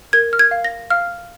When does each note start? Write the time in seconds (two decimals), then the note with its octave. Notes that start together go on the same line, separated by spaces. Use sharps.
0.13 A#4 G#6
0.33 F6
0.39 G#6
0.51 F5
0.65 A#6
0.90 F5 F6